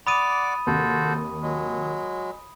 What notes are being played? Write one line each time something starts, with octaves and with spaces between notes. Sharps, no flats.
D5 F#5 B5 D6 D#6 D#7
D#2 C3 F#4 A4 C5
F#3 G#3